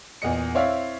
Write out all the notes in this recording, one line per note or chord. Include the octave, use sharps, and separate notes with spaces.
E2 A#2 D#5 C#7
C4 E4 C#5 D5 E5 F5